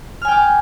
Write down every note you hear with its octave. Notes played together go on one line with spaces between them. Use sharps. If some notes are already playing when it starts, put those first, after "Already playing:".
G5 G#5 D6 F6